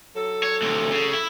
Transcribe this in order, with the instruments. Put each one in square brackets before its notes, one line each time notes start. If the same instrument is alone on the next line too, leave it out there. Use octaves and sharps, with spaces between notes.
[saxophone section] F#3 A4
[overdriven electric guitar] C#5
D2 C3
C#3
E4